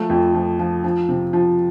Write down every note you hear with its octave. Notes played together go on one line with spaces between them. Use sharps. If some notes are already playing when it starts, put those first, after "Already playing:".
Already playing: F3 A3
F2
F3
F3
F3
C3
F3